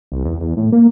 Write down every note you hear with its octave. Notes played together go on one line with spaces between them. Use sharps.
C2
E2
E2
A2
A#3